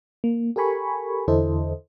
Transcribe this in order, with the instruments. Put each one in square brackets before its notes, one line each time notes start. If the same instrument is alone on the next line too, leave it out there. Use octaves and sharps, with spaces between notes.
[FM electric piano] A#3
G4 A4 A#4 G#5 B5 C#6
E2 D3 E4 A4 C5 D#5